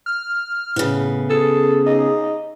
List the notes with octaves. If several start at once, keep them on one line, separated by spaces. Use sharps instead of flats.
F6
A2 C#3 B3
G#4 A4
D#4